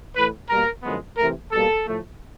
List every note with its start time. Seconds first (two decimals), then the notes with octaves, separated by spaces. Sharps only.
0.15 A2 E3 A3 B4
0.49 B2 G3 A#3 A#4
0.83 F#2 D3 F3 G#3 B3
1.17 C3 E3 A3 A#4
1.51 B2 G3 A#3 A4
1.85 A2 F3 A3